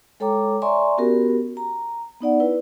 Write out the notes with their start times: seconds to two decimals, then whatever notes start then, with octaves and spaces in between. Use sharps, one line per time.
0.20 G#3 A4 C#5 G5 A#5 D6
0.62 D5 E5 G#5 A#5 C6 C#6
0.98 B3 C#4 F#4 G4 A#4
1.57 A#5
2.21 B3 D#4 D5 F#5
2.40 E4 B4